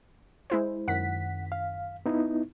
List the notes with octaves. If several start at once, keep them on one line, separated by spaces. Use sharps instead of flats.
G#3 E4 C5
F#2 D#3 F#5 B6
F5
B3 D#4 E4